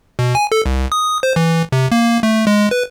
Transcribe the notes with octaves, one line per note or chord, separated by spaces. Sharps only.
B2
G#5
A4
C2
D#6
C5
E3
C3
A#3
A3
G#3
B4